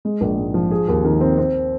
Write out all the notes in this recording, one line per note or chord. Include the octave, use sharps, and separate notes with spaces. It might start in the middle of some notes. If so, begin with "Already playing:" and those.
G#3
A#1
G#2
F3
G#4
D#2
D#3
C4
C4